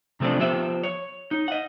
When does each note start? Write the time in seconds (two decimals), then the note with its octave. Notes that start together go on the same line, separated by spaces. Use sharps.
0.20 C3 F3 A3 C4 D4
0.40 F3 B3 G4 C5 E5
0.83 C#5
1.31 D#4
1.48 D#5 F#5